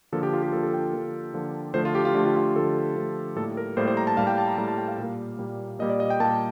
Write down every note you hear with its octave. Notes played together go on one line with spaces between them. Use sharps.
D3 F3 A#3 A4
G4
F4
G4
D3 F3 A#3 A4
A4
G5
D3 F3 A#3
D3 F3 A#3
D3 F3 A3 C5
F4
G4
F4
D3 F3 A3 G4
F4
F4
D3 F3 A3 A4
D3 F3 A3
A2 G3 A#3 A4
A#4
A2 G3 A#3 C5
C5
A#5
A5
A2 G3 A#3 F5
G5
A5
A#5
A2 G3 A#3 A#5
A5
G5
F5
A#2 G3 A#3
A#2 G3 A#3
A#2 G3 A#3 D#5
D5
D#5
G5
A#2 G3 A#3 A5